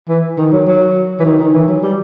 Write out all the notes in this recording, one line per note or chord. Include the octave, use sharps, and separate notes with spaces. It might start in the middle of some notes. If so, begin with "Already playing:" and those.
E3
D#3
F#3
F#3
E3
D#3
D#3
E3
F#3
G3